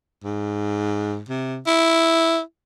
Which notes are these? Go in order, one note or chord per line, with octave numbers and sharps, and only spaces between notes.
G#2
C3
E4